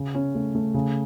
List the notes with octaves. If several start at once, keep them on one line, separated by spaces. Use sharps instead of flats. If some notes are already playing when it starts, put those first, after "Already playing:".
Already playing: C#3
C#4
A3
A3
C#3